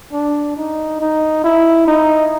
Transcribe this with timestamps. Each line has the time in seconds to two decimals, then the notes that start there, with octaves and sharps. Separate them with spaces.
0.13 D4
0.57 D#4
1.01 D#4
1.44 E4
1.87 D#4